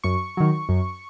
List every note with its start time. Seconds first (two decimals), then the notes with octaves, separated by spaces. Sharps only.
0.04 F#2 C#6
0.37 D#3 F#3
0.69 F#2